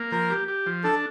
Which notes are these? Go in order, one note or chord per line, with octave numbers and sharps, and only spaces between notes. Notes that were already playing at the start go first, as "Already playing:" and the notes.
Already playing: A#3
F3 A#4
G4
G4
F3
D4 A4